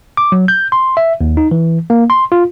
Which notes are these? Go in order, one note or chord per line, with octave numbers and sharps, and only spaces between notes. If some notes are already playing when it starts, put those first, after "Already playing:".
D6
F#3
G6
C6
E5
D#2
D#4
E3
A#3
C6
F4